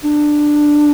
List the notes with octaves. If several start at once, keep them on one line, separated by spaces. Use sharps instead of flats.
D4